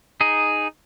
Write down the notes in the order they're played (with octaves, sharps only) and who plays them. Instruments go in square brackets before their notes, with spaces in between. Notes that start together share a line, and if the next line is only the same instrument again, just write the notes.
[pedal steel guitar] D#4 G#4